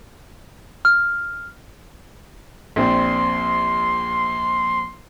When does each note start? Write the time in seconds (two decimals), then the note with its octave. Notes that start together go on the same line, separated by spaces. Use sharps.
0.85 F6
2.76 A#1 C4 D5 C6